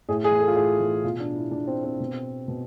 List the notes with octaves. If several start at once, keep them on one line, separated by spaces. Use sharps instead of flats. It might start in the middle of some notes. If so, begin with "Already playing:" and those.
A2 G#4
G#4
E3
A4
F4
A2 G#4
E3
B2 F4
D4
E4
B2 D4
C4
C4
B2
B2